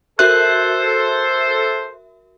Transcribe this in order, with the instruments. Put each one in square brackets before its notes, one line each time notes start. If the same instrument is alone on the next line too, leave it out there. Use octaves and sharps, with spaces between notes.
[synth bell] F#4 A#4 E5 [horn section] A4 C5 [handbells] F#6